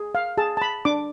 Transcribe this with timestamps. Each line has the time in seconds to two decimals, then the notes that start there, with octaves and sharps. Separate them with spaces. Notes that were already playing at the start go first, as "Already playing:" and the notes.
Already playing: G#4
0.15 F5
0.38 G#4 A5
0.57 A5
0.62 B5
0.85 D4 D6